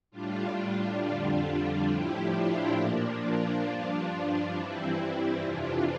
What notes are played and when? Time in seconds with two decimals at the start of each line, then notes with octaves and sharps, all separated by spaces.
0.11 A2 G3 D4 F4
0.55 D4 F4
0.99 F2 D3 G3
1.87 A2 F3 E4 G4
2.31 D4 F4
2.75 A#2 F3 A#3 D4
3.19 D4 F4
3.64 G2 F3
4.52 G2 E3 G3 C4 E4
4.96 C4 E4
5.40 F2 C3 E3 D4 F4